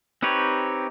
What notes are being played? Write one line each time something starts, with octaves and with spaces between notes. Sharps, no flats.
C4 D#4 G4 B4 C#5